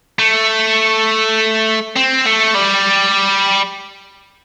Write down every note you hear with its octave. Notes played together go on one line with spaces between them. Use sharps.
A3
C4
A3
G3